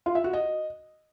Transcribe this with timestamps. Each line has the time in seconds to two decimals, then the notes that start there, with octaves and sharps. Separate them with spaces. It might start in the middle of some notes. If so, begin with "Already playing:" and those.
0.06 F4
0.15 E5
0.24 F#4
0.33 D#5